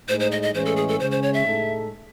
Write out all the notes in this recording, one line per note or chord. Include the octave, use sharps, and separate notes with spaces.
A2 G#3 D#4 C5
C5
D#5
D#5
A2 E3 G#3 C#4 C5
A4
G#4
A4
C#3 G#3 C#4 C5
C5
C#5
E5
A2 G#3 D#4 A4